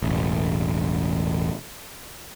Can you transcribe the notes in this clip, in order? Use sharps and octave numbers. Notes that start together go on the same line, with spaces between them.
E1 A1